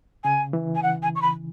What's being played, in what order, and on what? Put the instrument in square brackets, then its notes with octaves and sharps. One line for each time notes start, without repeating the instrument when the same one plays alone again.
[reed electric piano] C#3 [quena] G#5
[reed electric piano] E3
[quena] G#5
F#5
G#5
C#6
B5